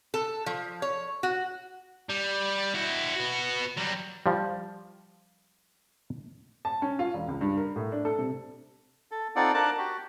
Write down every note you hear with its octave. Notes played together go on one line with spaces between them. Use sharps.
A4
F3
C#5
F#4
G3
E4 F#4
B3 F#4
F#3 G3
F3 G3
A5
C#4
F4
E1
C#2
G2
A#4
A2
D4
A4
C3
A4
C4 D#4 F4 A4 D5 F#5
D4 A#4 A5 D6 F#6
F#4 G4